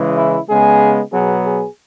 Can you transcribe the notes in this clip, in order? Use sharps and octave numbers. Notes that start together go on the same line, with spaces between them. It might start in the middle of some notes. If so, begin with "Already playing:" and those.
Already playing: C#3 E3 G#3
E4
C#3 G#3 B3 G#4
B2 F#3 B3 G#4
G#4